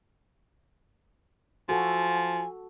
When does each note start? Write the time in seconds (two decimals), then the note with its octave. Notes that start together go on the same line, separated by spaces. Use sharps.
1.69 F3 F#4 A4 G#5